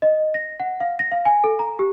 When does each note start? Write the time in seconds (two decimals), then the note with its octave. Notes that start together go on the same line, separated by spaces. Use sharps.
0.02 D#5
0.34 A#6
0.60 F#5
0.80 F5
0.99 A#6
1.11 F5
1.25 G#5
1.44 A4
1.59 A#5
1.79 G4